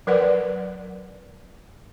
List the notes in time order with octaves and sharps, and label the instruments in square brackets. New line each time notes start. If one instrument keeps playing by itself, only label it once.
[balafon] F#3 A#4 B4 D5 F#5